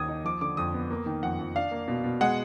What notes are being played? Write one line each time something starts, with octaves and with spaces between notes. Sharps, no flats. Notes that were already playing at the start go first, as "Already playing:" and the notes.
Already playing: D#2 D#3 A#3 D#6 G#6
D#4
F3 D6
D3 D6
F2 D#6
B3
A#3
D#3
F2 F#5
F2
D4 F5
A#3
B2
B2
G#3 F#5